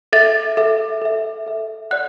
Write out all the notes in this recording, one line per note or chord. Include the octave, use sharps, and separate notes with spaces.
A4 E5 A6
A4 E5
A4 E5
A4 E5
D5 F#5 F#6